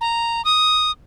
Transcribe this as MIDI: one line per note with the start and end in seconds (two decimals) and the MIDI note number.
0.01 0.44 82
0.45 0.91 87